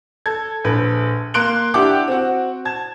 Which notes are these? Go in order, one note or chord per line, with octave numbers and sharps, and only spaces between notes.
A4 G#6
A#1 A4 B4
A#3 C6 F#6 D7 G7
D4 E4 G4 F#5 G5 D6
C4 F#4
A5 G#6